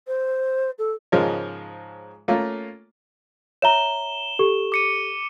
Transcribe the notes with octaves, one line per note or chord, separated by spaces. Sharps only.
C5
A4
G#2 C#3 F3 G#3 A#4 C#5
A3 A#3 C#4 F4
C#5 E5 A#5 E7 G7
G4 A4 C#6
D6 C#7 D#7